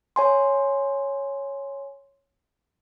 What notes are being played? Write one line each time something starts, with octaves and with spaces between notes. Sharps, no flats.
C#5 G#5 C6